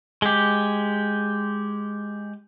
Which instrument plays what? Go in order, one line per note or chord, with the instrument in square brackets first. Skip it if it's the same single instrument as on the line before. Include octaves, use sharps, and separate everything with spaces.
[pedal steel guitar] G#3 G4